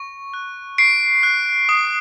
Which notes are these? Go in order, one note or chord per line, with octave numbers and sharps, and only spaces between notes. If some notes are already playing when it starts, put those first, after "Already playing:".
Already playing: C#6
F#6
C#6 C7 D7
F#6
D#6